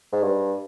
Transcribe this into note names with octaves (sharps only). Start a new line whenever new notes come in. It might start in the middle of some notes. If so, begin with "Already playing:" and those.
G#2
G2